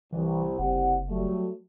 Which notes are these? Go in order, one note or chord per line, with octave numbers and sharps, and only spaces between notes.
C2 E3
F#1 C2 G4 F#5
F#3 G3 A3